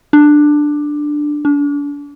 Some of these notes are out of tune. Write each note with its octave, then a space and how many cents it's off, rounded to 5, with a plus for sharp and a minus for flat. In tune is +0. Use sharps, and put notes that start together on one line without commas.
D4 +10
D4 -35